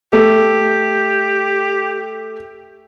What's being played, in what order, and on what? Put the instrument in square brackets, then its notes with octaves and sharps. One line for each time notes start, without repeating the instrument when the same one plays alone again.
[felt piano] A3 [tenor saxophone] G4